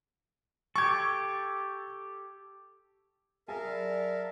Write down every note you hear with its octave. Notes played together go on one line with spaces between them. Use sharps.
G4 A4 C#6 G#6
G#4 A#4 E5 F5 G#5 A5
F#3 D5 B5